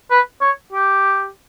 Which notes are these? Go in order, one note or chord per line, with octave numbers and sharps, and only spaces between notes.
B4
C#5
G4